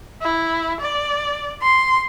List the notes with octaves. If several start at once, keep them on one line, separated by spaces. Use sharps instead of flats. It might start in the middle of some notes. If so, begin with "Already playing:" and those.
E4
D5
C6